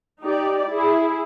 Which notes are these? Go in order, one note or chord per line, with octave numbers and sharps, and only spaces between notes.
D#4 G4 D5
E4 G#4